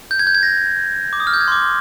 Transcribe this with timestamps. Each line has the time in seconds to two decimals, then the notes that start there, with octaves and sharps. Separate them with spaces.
0.11 G6
0.19 G#6
0.27 G6
0.35 G#6
0.43 A#6
1.13 D6
1.20 D#6
1.27 F6
1.33 G6
1.41 G#6
1.48 C6
1.52 D6
1.62 C6